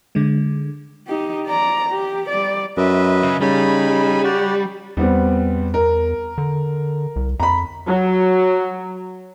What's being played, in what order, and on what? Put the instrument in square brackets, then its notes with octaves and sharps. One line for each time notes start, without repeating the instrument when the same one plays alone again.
[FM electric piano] D3 G#3
[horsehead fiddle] D#4 G4
D5 A#5
G4
G3 D5
[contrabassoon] F#2 [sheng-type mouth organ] B4 D#5 E5
[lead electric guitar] C#3
[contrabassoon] C#3 [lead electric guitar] G3 [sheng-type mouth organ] D#4 G#5 B5
[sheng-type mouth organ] F#4 G4 D5
[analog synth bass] E2 [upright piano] G3 B3 C4
[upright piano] A#4
[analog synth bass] D3
C2
[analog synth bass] F2 [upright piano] A#5 B5
[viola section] F#3